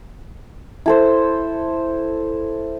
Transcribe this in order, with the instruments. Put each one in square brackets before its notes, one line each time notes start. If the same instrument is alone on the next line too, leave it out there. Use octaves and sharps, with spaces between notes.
[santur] E4 A4 C5